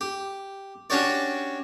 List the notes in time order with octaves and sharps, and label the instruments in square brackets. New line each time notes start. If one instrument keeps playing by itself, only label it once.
[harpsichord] G4
C#4 D4 F#4 G4 C#5 D5